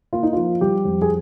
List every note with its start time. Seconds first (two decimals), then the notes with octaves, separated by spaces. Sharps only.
0.13 A#3 F4
0.23 D#4
0.33 F3 F4
0.61 G3 G4
0.85 F2
1.02 G#4